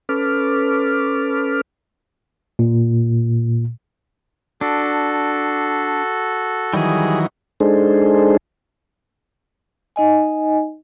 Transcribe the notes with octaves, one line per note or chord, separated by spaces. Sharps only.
C#4 A4 B4 D6 F6
A#2
D4 F#4 A4
D#3 E3 F#3 G3 G#4
G#3 D4 D#4 G#4 A4 C5
D#4 D#5 G#5